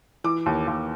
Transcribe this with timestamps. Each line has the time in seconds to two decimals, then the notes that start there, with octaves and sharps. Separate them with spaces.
0.24 E3 D6
0.46 D#2
0.67 D#2